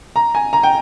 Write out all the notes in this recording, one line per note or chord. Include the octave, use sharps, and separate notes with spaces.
A#5
G#5
A#5
G5